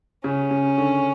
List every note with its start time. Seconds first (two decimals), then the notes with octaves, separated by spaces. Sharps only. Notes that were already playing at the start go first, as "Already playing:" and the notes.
0.24 C#3 C#4
0.51 C#3
0.78 D3